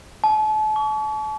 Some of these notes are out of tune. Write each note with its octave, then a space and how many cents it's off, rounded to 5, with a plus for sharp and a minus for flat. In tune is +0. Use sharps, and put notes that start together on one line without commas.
A5 -40
C#6 +40